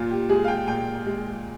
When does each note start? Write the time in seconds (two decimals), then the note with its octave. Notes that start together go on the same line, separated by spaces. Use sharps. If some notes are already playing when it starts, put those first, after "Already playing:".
Already playing: A#2 F4
0.11 G4
0.29 G#3 G#4
0.44 F5
0.48 G5
0.68 A#2 G5
1.06 G#3